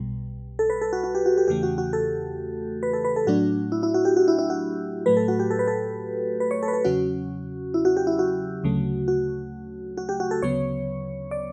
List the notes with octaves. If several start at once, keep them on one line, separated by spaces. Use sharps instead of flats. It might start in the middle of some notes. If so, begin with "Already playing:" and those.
Already playing: B1 B2 G3
A4
B4
A4
F#4
F#4
G4
F#4
G4
E2 C#3 E3 A3 G4
F#4
F#4
A4
B4
A4
B4
A4
A2 F#3 A3 D4 F#4
E4
E4
F#4
G4
F#4
E4
E4
F#4
A2 F#3 A3 B4
A4
F#4
G4
A4
B4
A4
B4
C#5
A4
B4
A4
E2 C#3 F#3 C#4 F#4
E4
F#4
G4
E4
F#4
D2 C#3 F#3 A3
F#4
F#4
G4
F#4
A4
D2 C#3 F#3 B3 C#5
D5